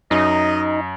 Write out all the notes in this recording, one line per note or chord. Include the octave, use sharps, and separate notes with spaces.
F#2 D#4 D#5